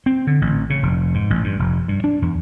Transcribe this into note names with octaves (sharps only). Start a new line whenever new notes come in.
C4
D3
A1
C#3
F1
G#2
A1
G2
F1
G2
D4
E2